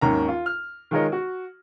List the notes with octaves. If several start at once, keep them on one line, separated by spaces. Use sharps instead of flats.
G#1 D#2 D#3 C#4 A#5
F4
F6
D#3 G#3 F4 A#4 C#5 D#5
F#4